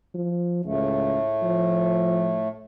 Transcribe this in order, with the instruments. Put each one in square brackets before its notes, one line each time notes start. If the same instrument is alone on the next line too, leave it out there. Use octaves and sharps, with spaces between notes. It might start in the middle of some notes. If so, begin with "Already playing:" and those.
[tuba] F3
[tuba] C#2 [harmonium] A2 A3
[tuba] F3